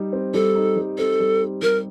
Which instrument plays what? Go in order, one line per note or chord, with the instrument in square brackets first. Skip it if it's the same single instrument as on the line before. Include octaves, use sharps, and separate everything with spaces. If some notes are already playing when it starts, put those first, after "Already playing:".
Already playing: [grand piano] G3 D#4
C4
[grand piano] G3 [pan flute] A4
[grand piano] D#4
G3
[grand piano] C4 [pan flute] A4
[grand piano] G3
D#4
[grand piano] G3 [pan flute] A#4